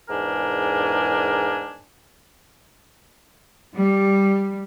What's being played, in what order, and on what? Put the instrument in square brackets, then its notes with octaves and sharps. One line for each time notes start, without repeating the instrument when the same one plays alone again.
[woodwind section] E2 G#2 D4 A#4 G#5
[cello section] G3